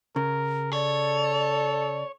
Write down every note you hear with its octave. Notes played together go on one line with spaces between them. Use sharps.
C#3 A#4
A4 C#5 D5